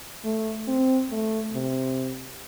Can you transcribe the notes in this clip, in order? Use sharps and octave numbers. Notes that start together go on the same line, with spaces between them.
A3
C4
A3
C3